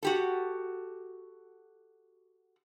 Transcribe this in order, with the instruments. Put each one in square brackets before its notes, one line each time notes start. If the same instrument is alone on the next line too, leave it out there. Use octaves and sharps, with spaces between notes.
[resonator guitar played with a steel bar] F#4 G4 A4